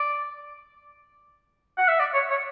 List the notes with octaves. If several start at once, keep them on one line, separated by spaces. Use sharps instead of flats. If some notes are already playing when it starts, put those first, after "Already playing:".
Already playing: D5
F#5
E5
D5
C#5
C#5